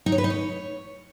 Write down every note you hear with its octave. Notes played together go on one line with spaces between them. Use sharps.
D#4
C#5
B4
D#4
C#5